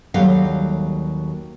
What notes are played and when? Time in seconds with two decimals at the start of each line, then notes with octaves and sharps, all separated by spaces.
0.14 D#2 F#3 G3 A4 F5